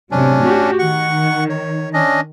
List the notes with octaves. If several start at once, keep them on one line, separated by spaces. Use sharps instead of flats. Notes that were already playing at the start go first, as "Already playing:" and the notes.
A2 C3 F#3 C#4 D4
F#4 G4
D#3 F#5 C#6
C#5
C#4 D4 D#5